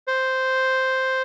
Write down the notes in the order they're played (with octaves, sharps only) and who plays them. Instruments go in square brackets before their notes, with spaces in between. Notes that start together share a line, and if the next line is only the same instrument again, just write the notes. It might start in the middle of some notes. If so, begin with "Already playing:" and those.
[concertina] C5